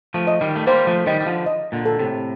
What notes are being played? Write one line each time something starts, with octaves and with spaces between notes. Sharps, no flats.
F3 A3
D#5
D#3 G3
A3
G3 A#3 C5
F3 A3
D#3 G3 D#5
G3
D3 F3
D#5
A#2 D3
A4
A2 C3